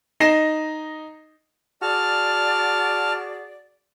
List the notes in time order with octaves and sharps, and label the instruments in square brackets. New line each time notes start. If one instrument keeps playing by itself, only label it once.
[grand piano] D#4 D#5 A#6 C7 E7
[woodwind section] F#4 G#4 D5 [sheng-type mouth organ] A5 F6